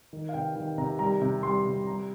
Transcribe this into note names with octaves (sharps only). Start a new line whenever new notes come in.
D#3
F5
C3 G5
D#3 G5
C3 A#5
G3 A#5
C3
G3 C6
C3
G3 A#5